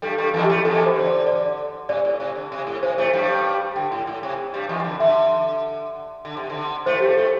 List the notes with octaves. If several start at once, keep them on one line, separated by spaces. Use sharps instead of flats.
G2 G3 A4
G2 G3
A4
E2 E3
G4
A2 A3
E2 E3 A4
C5
D3
D5
D5
C3 D5
A2
C3
D3
C3
A2
C3 C5
A2 A3
G2 G3
D3 G5
A2
A2
C3
G2 G3
E2 E3
D3
D3 E5
D3
C3
D3
A2 A3 C5
G2 G3 G4
A4
A2 A3